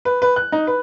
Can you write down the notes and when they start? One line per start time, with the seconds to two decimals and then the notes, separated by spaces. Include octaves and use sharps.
0.05 B4
0.22 B4
0.36 F#6
0.52 D#4
0.67 B4